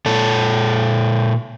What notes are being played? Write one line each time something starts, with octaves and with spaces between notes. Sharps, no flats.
A#2 A4